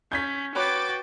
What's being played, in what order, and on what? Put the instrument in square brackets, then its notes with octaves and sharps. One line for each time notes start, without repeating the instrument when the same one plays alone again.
[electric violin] C#4 [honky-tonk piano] G6 G#6 B6
[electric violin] F#4 G5 [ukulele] B4 C#5 B5 [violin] D6 A6